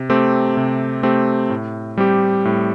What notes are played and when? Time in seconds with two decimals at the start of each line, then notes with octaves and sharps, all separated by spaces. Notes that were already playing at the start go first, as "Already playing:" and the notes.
Already playing: C3
0.10 A3 C4 G4
0.57 C3
1.03 A3 C4 G4
1.50 A2
1.98 G3 C4 G4
2.45 A2